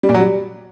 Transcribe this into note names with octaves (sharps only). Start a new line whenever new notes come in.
G3
A#2
F#3
G3